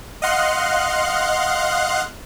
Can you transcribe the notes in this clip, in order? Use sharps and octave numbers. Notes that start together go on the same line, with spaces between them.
D#5 F5 F#5 C6 F#6